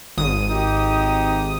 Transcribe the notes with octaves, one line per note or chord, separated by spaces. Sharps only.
G#1 D#6
D#4 G4